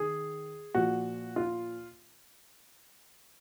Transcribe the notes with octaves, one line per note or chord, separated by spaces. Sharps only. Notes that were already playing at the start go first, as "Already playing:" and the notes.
Already playing: D#3 G#4
A#2 F3 F#4
F4